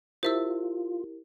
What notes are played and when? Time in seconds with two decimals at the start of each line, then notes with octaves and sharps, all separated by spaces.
0.23 E4 F4 G4 A#4 C5 E5 E6